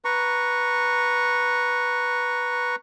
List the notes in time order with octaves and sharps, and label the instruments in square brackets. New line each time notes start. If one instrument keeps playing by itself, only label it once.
[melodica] B4 A#5 C#6